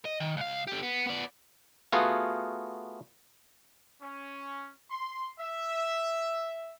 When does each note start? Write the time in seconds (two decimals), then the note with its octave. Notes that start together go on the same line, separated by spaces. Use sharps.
0.05 D#5
0.20 D#3
0.37 C#2 F5
0.67 D3 G4
0.82 B3
1.07 B3 D5
1.92 A3 B3 F4 F#4 G#4 F5
4.01 C#4
4.90 C6
5.39 E5